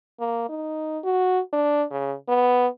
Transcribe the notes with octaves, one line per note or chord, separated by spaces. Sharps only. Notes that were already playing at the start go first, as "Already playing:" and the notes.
A#3
D#4
F#4
D4
C#3
B3